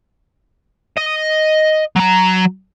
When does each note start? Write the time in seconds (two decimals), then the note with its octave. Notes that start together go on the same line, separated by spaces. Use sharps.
0.98 D#5
1.96 F#3 A#5